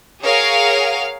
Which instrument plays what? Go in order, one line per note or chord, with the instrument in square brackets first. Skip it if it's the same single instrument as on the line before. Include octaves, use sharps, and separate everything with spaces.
[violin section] G#4 A#4 C#5 F5 F#5